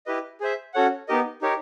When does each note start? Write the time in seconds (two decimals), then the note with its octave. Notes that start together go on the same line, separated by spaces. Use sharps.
0.06 E4 G4 B4 D#5
0.40 G#4 C5 E5
0.74 C#4 F#4 A4 C#5 F#5
1.08 B3 D#4 G4 A#4 D#5
1.42 D#4 G4 A#4 C#5